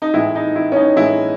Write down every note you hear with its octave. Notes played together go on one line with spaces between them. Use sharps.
D#4
A2 E3 G#3 E4
D#4
E4
C#4
D#4
A2 E3 G#3 E4